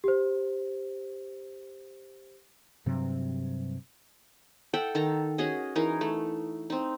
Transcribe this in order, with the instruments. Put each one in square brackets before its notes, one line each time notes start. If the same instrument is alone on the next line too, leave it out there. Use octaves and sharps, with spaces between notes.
[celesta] G4 C5
[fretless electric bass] G2 C3 F#3 C4
[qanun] A4 E5 F#5 G5
D#3 A4 A#5
C#4 F#4 G#4 D#5
E3 D#4 G#4 A#4
A3
C4 D#4